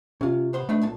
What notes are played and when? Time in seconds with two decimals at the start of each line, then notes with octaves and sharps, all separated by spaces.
0.21 C3 C#4 F4
0.53 B3 C5 C6
0.69 A3 D4 D#4 B4
0.82 B1 A#2 A5